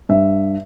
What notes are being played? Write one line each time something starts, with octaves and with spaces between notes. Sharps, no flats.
G2 E5